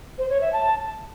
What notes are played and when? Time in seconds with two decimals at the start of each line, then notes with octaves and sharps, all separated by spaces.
0.18 C5
0.30 C#5
0.41 E5
0.53 A5